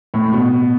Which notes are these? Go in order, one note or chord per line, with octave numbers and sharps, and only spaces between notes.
A2
B2